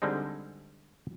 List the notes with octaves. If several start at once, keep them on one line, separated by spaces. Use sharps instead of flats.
D3 G3 G#3 C4 D#4